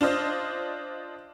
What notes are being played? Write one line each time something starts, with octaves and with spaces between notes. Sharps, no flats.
D4 F4 C5 D#5